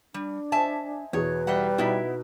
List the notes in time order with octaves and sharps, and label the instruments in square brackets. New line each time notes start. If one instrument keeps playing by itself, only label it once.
[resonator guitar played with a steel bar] G3 [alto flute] D4
[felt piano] C5 D#5 G#5 [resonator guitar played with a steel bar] E5 A5
[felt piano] E2 B2 G#4 [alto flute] B4 [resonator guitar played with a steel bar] C#5
[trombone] G3 [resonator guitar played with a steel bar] D#5 E5 F#5
[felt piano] B2 D#4 [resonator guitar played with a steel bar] B3 E4 E5